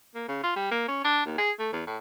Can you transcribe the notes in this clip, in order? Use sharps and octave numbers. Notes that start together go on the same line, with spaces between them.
A#3
C#3
F4
G3
A#3
C#4
D4
D#2
G#4
A3
E2
A2